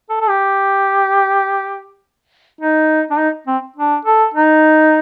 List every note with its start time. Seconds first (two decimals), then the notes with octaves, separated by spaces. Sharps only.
0.09 A4
0.21 A4
0.29 G4
2.61 D#4
3.10 D4
3.19 D#4
3.47 C4
3.76 D4
4.05 A4
4.34 D#4